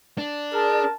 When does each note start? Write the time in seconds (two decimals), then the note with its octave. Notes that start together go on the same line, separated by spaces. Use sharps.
0.18 D4
0.53 G#4 A#4 A5